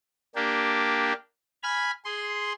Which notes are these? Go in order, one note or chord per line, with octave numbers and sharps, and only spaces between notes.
A#3 D4 G4
G#5 B5 F6
G#4 C6